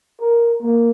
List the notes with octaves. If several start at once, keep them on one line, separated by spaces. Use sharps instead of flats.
A#4
A#3